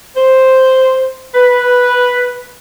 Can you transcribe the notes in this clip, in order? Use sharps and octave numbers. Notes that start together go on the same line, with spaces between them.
C5
B4